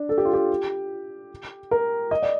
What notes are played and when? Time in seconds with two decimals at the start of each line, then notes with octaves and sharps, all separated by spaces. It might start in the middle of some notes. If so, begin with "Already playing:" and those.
Already playing: D4
0.09 A4
0.18 G4
0.25 F4
0.33 G4
1.71 A#4
2.11 D#5
2.22 D5